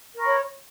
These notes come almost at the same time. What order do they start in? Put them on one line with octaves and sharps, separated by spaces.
A#4 C#6 B5 C#5